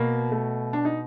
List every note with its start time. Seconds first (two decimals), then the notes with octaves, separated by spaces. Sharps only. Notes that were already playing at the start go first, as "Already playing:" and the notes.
Already playing: B2 A#3
0.32 A3
0.73 D4
0.85 D#4